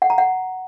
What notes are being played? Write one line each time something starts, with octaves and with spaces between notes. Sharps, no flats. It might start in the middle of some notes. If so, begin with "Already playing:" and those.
F#5
A#5
F#5